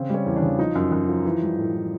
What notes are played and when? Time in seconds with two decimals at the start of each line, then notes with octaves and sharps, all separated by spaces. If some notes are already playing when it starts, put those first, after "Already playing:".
Already playing: C#3 C4
0.09 G3 C#4
0.26 E2
0.36 D4
0.42 C#3
0.59 F3 D#4
0.75 F#2
0.92 F#2
1.08 F3
1.25 E3
1.42 G3
1.58 A2
1.74 E3